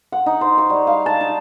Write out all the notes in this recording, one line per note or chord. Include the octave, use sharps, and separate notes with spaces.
F#5
D#4
C5
C#6
G3
F5
A5
D#4